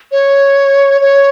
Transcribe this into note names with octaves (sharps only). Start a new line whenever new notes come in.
C#5
C#5